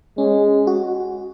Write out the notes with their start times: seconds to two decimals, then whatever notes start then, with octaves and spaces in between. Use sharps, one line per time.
0.18 G#3 C#4
0.67 F#4